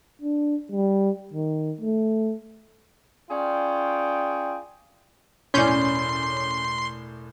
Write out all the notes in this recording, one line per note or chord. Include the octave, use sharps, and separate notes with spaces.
D4
G3
D#3
A3
C#4 F4 G#4 D5 G5
E1 A2 C#4 D5 C6 G6